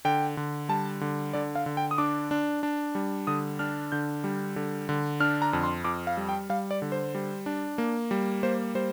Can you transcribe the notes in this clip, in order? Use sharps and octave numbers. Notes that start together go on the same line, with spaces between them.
D3 G5
D3
G3 A5
D3
D3 D5
F5
D3
G5
D#6
D4 D6
D4
D4
G3
D3 D#6
D4 F6
D3 G6
G3
D3
D3
D4 F6
A#5
F2
C6
F2 D6
F5
G3
G5
G3 F5
D5
D3
C5
G3
D4
A#3
G3
A#3 C5
G3 C5